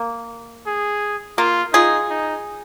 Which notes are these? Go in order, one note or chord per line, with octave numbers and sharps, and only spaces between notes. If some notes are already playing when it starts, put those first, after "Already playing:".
Already playing: A#3
G#4
A#3 F4
D#4 F4 G#4
D#4